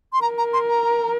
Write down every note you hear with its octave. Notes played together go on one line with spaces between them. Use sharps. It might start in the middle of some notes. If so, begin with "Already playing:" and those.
C6
A#4 A#5
A#5
C6
A#5